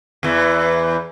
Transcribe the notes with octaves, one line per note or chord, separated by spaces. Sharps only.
E2 E3